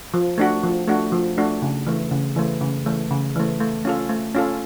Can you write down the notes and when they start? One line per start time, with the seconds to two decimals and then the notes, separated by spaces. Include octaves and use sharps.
0.14 F3
0.38 A3 D4 F#4
0.63 F3
0.88 A3 D4 F#4
1.12 F3
1.37 A3 D4 F#4
1.62 C#3
1.87 E3 A3
2.11 C#3
2.36 E3 A3
2.61 C#3
2.86 E3 A3
3.11 C#3
3.36 E3 A3
3.60 A3
3.85 C#4 F4 A4
4.09 A3
4.35 C#4 F4 A4